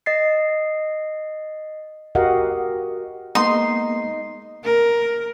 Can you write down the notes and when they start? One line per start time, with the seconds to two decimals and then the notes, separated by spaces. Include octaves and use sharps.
0.06 D#5 A6 C7
2.15 F#4 G4 A#4 D#5 F5 F#5
3.35 G#3 A#3 B3 D#4 C6
4.64 A#4